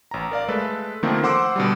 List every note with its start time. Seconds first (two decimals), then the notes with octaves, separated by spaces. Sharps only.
0.11 A1 A#5
0.31 A#4 D5 F5
0.48 G#3 A3 A4 B4
1.03 D3 D#3 F3 A3 A#3 C4
1.23 C5 F#5 C6 D6 E6
1.56 B2 D3 G3